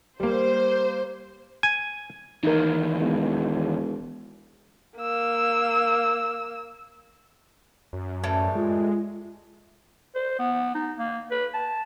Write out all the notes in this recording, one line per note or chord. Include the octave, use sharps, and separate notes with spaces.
G3 A#3 C5
G#5
D#2 E3 D#4 A#4
E1
A#3 E6
F#2
A2 E3 G3
G#3 F4
C5
B3
D#4
A#3
B4
A5